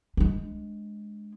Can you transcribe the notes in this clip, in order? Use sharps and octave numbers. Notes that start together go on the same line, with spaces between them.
G#3 D4